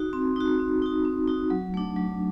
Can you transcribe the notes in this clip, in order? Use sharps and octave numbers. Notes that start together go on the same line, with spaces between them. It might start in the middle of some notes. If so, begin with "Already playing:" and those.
Already playing: D#4 F#4
C4
D#4 F#4
C4
D#4 F#4
C4
D#4 F#4
F#3
A3 D4
F#3